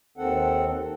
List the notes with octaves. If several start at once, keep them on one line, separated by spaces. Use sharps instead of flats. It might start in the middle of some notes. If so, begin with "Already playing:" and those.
D#2 D#3 C4 A4 F#5